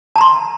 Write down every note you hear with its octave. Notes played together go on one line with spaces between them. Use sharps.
A5 A#5 C6